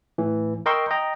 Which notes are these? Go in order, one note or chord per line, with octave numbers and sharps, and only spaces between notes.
A2 E3
A#4 D#5 G5 C6 C#6 E6
D#5 G5 A#5